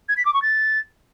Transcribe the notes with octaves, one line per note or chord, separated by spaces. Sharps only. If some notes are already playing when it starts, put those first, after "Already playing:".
G#6
B6
D6
C#6
A6